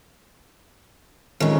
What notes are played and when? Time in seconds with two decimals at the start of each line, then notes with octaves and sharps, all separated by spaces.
1.40 F2 D#3 G#3 C#4